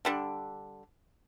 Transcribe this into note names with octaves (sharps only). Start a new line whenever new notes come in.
D3 G3 D4